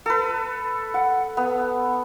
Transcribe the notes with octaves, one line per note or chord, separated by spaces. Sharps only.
A4 B4
F#5
B3